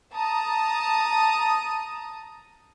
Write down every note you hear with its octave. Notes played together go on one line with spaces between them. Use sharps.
A5 A#5 D#6